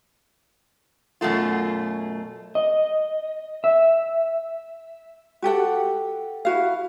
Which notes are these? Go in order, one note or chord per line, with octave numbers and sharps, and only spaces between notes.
F#2 B2 A3 F4
D#5
E5
F#4 G4 A4 F#5
E4 F#4 F5